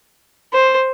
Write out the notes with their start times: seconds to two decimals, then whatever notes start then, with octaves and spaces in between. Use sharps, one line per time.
0.53 C5